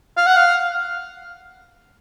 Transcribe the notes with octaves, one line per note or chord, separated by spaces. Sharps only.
F5
F#5
F5